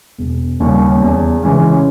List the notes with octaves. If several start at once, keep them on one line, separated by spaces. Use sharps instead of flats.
E1
D#2 C#3 G3 C#4
E2
C#3 E3 G#3 C#4